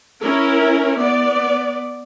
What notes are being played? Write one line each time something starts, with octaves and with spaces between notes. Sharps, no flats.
C#4 E4 A#4
B3 D5